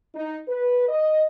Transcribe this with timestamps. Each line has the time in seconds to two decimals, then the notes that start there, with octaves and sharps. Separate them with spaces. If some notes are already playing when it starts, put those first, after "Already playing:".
0.15 D#4
0.48 B4
0.89 D#5